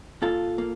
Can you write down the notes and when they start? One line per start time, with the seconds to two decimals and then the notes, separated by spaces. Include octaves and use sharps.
0.22 A#2 F4 A4
0.58 A#3